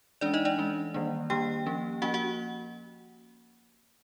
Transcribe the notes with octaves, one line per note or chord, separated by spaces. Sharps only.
E3 G#3 C#4 D4 D5
D#4 D#5
D4 D5
E3 G#3 C#4
D#3 G3 A#3 D4
D#3 G3 A#3 D4 G4 G5
F3 A#3 C#4
F3 A#3 C#4 F#4 F#5
F#4 F#5